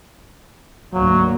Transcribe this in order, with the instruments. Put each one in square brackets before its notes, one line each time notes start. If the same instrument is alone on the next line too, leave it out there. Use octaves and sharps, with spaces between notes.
[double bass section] D2 G#2 A#3 [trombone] F#3